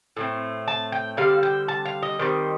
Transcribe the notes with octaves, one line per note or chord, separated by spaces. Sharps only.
A2 A3 C4
A5
G5
D3 G3 C4 F5
G5
A5
F5
D#5
D#3 G3 C4